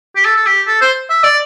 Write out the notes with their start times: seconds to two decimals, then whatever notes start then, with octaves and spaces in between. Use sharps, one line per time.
0.16 G4
0.25 A4
0.36 A4
0.46 G4
0.67 A4
0.81 C5
1.10 E5
1.24 D5